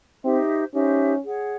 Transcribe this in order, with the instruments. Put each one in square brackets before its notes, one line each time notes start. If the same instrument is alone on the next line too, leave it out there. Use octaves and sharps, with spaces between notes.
[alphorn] C4 [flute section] D#4 G4 C5 E5
[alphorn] C#4 [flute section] D#4 G4 C5 E5
[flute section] G#4 C#5 F#5